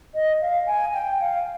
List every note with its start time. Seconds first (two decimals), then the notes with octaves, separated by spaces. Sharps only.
0.15 D#5
0.41 F5
0.67 G#5
0.94 G5
1.20 F5